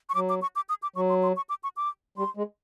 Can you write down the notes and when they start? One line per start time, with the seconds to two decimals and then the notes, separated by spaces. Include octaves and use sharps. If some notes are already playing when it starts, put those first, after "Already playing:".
0.09 C#6
0.15 F#3 D6
0.29 D6
0.42 C#6
0.56 D6
0.69 D#6
0.83 D6
0.96 F#3 C#6
1.09 C6
1.23 C6
1.36 C#6
1.49 D6
1.63 C#6
1.77 D6
2.17 G3 C6
2.37 G#3